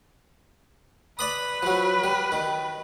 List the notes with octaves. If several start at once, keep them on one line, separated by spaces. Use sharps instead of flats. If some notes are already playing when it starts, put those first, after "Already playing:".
B4 D5 B5 D#6
F3 F#3
G3
D#3